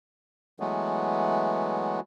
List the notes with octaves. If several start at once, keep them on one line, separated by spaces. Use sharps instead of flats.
E3 F#3 G#3 A3 B3